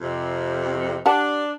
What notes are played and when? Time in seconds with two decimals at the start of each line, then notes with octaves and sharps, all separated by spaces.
0.01 F2 C3
1.06 D4 G4 F#5 A5